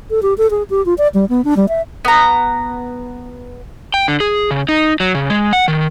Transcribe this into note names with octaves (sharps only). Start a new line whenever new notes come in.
A4
G4
A4
G#4
G4
F4
D5
G3
B3
D4
G3
E5
B3 A#5
G5
D3
G#4
C#3
D#4
F#3
C#3
G#3
F#5
D#3